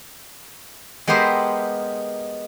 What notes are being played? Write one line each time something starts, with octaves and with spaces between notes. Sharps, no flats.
G#3 B3 G4 A#4 C5 E5